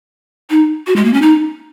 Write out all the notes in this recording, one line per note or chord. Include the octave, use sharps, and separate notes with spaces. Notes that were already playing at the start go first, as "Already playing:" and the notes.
D#4
F#4
G#3
A#3
C#4
D#4